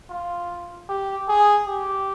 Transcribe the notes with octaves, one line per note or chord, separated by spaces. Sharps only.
F4
G4
G#4
G4